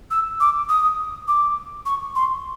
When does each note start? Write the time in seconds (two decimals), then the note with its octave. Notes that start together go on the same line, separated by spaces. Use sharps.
0.11 E6
0.40 D6
0.69 D#6
1.28 D6
1.86 C#6
2.15 C6